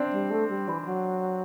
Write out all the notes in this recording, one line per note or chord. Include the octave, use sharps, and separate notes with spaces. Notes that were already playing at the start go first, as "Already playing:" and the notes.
Already playing: C4 D4
G3
A3
G3
E3
E3
F#3